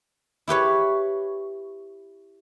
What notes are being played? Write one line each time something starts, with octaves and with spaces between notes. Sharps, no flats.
E4 G4 B4 C#5